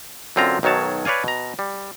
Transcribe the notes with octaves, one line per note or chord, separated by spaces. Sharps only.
F#2 D3 C4 F4 A#5
B1 D#3 F#3 C#5 A5
B4 C#5 D5 F5 G#5
B2 A#5
G3